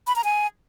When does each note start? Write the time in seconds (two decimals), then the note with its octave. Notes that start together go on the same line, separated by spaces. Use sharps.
0.07 B5
0.16 A#5
0.24 G#5